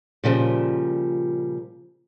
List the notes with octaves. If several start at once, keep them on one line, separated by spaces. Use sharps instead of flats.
A#2 C#3 F3 G3